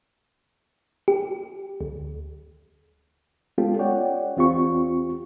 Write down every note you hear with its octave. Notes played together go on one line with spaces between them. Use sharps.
G4
D2
G#3 B3 C#4 F4 G4 A4
C#5 D5 F#5 G5
E2 C4 F4 G4 C#6